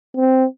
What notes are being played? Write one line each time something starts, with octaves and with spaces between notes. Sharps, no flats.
C4